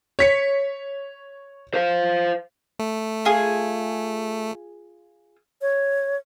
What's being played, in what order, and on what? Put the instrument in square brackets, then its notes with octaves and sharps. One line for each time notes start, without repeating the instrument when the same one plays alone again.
[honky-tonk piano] C#5 B6 C#7
[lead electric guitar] C5 F5
[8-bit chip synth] A3
[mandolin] F4 G#4
[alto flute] C#5